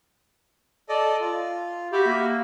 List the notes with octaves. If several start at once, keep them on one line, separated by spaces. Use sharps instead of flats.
A4 D5 D#5
F4
F#4 G4 E5 B5
A#3